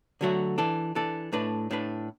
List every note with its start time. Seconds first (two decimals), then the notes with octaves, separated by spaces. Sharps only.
0.21 D3 F#3 A3 F#4
0.58 E3 D4 A4
0.95 E3 D4 A4
1.33 A2 A3 D4 B4
1.71 A2 A3 D4 B4